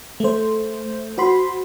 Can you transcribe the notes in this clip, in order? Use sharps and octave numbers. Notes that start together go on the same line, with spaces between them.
A3 C5
F#4 C5 B5 C6